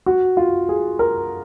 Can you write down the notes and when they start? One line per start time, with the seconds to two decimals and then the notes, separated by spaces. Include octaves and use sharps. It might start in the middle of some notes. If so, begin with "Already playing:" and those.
0.06 F#4
0.37 F4
0.69 G#4
0.99 A#4